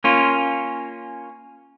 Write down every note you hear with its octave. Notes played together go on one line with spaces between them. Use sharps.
A#3 C#4 F4